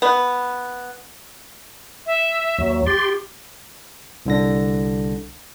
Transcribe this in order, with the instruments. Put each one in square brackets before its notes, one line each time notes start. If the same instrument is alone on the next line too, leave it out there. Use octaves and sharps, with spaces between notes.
[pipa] B3
[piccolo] E5
[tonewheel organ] D#2 F#3
[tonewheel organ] G4 C6 [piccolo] A6
[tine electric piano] C2 D3 A#6